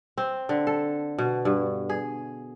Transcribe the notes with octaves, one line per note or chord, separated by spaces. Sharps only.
C4
D3
A4
B2
G2
G#4